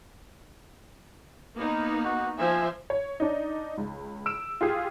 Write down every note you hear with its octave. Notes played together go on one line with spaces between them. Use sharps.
A#3 B3 D#4
F#4
F3 C5 E5 G#5
C#5
D4 D#4
C#2
E6 D7 E7
F4 G4 G#4